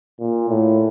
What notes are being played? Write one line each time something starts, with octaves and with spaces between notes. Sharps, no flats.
A#2
A2